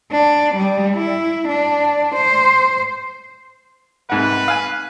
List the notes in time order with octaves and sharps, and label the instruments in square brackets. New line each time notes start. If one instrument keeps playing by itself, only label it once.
[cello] D4
G3
E4
D4
C5
[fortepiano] C2 G#2 F#5 [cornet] B4
[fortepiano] F5 G#5